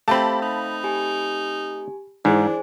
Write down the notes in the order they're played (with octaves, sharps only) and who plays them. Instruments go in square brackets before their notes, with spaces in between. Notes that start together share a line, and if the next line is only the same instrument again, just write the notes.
[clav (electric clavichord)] A3 C4 [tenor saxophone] G4 [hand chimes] F5 [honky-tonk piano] A5 B5
[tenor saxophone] D#4
[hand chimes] G4 G#5
[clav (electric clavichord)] G#2 [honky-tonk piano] E3 [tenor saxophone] D4 [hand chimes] G#4 C5 G#5